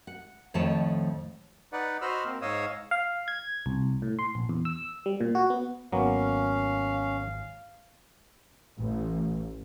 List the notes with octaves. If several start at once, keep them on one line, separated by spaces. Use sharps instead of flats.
F#5
F2 A2 D#3 F3 C#5 A5
D#4 B4 D5 F#5
F#4 C5 D#5 B5 E6 F6
A#3 C4
G#2 C#5 D#5 F5 D#6 E6
F5
G#6
C2
A2
C6
A#1
E2
E6
G3
A#2
F#4
B3
G#1 F#3 A#3 B3 C#4 F5
A1